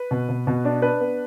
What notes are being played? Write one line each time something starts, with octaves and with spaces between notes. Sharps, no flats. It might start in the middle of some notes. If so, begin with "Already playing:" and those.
Already playing: B4
B2
B2
B2
D4
D4 B4
B3